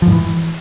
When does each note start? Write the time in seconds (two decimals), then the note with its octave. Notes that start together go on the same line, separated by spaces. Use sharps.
0.02 F3
0.07 G#2
0.12 E3